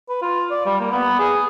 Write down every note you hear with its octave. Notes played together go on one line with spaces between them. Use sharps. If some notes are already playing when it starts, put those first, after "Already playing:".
B4
F4
D5
G3
A#3
B3
G#4